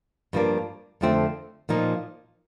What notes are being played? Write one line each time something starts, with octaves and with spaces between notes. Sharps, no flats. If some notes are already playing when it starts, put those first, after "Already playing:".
G2 F3 A#3 D4
F2 D3 F3 A3 C4
A#2 F3 A#3 D#4